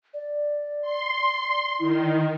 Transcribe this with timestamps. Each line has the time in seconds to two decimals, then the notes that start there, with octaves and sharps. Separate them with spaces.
0.14 D5
0.82 C6
1.80 D#3 E4